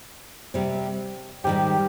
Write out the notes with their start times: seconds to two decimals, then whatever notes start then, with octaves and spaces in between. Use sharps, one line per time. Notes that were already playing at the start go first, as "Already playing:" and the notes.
0.54 C3 G3 C4
1.44 G#2 D#3 G3 G4